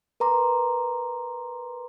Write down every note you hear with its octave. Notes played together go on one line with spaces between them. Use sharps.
A#4 B4 A#5 C6 D6